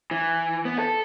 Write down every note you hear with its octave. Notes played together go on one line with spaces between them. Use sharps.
E3
B3
A4